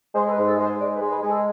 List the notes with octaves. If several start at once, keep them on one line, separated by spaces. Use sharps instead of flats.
G#3 C5
A4
B4
G#2
A4
G#3
C5
G#2 D5
B4
G#3
B4
G#3
A4